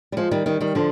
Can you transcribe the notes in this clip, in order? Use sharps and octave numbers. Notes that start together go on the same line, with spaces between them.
G3
F3 G#3
D#3 G3
D#3 G3
D#3 G3
D3 F3